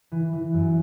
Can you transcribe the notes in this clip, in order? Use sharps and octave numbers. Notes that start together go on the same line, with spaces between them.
E3
E3
F#2